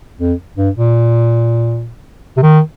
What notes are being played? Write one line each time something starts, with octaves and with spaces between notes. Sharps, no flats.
F2
G2
A#2
C3
D#3